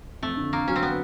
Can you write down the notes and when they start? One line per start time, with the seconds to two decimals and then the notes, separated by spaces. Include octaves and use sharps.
0.22 F2 A3
0.37 D3
0.53 D3 A#3
0.68 F#3 C#4
0.76 C4
0.83 B3